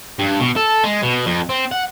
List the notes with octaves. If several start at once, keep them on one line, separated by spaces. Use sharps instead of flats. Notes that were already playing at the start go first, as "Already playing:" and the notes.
G2
B2
A4
G#3
B2
F2
C4
F#5